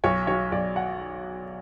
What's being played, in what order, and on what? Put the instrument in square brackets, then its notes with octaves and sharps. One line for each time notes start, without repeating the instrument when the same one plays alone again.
[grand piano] B1 C#5
F#3 C#5
B1 D5
F#5